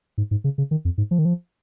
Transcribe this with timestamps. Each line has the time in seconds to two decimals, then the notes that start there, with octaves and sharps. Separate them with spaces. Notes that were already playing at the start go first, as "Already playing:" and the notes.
0.18 G#2
0.31 G#2
0.44 C#3
0.58 C#3
0.71 D#3
0.85 F2
0.98 G#2
1.11 F3
1.19 D#3
1.25 F3